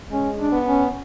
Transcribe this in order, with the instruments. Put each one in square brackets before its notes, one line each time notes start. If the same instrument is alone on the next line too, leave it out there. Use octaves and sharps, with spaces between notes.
[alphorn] G#3 [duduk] C#4
[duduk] D4
[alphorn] B3
[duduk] C#4